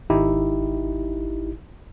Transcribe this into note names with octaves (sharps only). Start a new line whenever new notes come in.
G#1 D#4 E4 G4